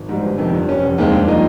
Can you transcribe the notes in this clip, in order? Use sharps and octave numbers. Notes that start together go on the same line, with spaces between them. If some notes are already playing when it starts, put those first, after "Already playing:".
Already playing: G#1
G#2 G3
G1
F2 C3 D#3
G2
G3 C#4
F1
D#2 D#3 G#3 C4
G2
F3 A#3 D#4